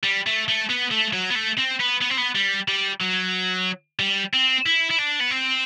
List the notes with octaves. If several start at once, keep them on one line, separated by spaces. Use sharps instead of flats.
G3
A3
A3
B3
A3
F#3
B3
A3
C4
B3
B3
C4
B3
G3
G3
F#3
G3
C4
E4
E4
D4
B3
C4